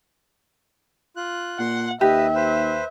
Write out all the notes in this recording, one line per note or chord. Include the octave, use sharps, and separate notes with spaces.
F4 F#6
A#2 F#5 C6 F#6
D#2 G4 B4 D#5 E5
B4 C5